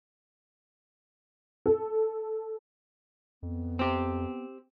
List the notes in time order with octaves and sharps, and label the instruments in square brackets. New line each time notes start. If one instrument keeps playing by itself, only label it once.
[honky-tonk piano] A4
[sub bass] F2 [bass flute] B3
[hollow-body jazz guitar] C4 G4